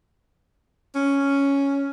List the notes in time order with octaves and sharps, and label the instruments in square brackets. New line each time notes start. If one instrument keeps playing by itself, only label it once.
[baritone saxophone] C#4